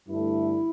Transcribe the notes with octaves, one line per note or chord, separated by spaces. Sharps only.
G2 D3 A3 E4